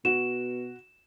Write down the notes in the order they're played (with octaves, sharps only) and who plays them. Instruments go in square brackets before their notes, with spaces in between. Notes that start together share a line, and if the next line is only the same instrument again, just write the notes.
[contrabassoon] B2 [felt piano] F#4 [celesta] E7